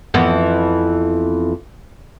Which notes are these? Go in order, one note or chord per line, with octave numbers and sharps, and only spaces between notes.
F2 E3 B3